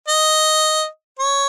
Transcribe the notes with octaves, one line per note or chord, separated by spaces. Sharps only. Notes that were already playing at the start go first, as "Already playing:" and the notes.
D#5
C#5